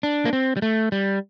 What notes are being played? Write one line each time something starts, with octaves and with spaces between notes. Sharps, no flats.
D4
A#3
C4
G3
A3
G3